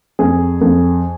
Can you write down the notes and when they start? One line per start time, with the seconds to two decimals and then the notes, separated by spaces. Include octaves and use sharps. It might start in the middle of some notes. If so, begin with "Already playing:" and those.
0.19 F2 G#4
0.61 F2